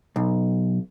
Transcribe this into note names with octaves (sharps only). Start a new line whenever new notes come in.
B1